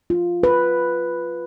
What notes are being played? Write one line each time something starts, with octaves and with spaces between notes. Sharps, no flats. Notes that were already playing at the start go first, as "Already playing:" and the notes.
F4
B4